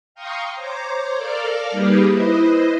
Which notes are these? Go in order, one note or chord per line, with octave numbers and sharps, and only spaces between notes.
F5 G5 A#5 C6 C#6 D#6
C5 C#5 A#5 D6
A4 A#4 D5 F5 D6 F6
G3 A#3 D#4 G4 G#4 B4
E4 B4 C5 D#5